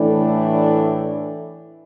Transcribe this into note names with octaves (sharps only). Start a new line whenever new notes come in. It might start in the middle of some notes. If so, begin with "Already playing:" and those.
Already playing: A2 E3 A3 D4